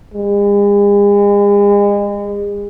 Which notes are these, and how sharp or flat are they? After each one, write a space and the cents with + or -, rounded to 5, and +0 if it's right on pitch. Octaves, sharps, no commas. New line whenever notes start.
G#3 -40